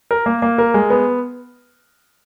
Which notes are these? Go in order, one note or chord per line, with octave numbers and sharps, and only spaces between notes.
A#4
A#3
A#3
A#4
G#3
B3